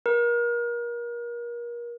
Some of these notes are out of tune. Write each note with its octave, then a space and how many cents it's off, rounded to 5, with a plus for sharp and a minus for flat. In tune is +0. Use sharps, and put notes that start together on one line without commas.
A#4 +35